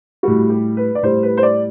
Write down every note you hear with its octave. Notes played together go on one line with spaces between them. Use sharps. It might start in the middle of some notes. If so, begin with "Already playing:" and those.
A2 G3 F#4
G4
B4
D5
A2 G3 C5
B4
C5
D5